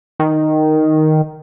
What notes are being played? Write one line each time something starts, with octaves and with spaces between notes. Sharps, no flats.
D#3